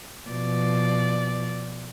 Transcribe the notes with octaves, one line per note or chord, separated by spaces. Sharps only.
B2 F3 D5